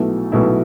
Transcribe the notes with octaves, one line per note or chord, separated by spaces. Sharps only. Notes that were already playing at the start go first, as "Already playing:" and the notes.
Already playing: B1 B2 A3 E4
B1 B2 A3 E4